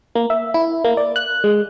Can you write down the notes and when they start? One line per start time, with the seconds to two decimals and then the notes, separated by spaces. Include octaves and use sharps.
0.15 A#3
0.30 E5
0.54 E4
0.84 A#3
0.97 D5
1.16 F#6
1.44 G#3